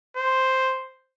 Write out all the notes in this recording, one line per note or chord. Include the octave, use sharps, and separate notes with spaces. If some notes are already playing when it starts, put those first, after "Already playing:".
C5